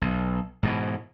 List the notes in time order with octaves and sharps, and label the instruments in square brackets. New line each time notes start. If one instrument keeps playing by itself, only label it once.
[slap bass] B1
G#2 B2 E3